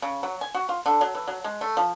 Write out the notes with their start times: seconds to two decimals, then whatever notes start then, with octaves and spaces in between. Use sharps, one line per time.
0.02 C#3
0.23 F#3
0.41 G#5
0.54 F#4
0.69 F4
0.86 D3
1.01 F#3
1.15 E3
1.27 F#3
1.44 G#3
1.61 A3
1.77 F3